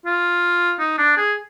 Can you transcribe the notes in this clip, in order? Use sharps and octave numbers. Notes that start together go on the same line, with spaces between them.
F4
D#4
D4
G#4